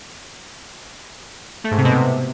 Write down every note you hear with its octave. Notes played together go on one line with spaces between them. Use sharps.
A3
G#2
C3
B2
C3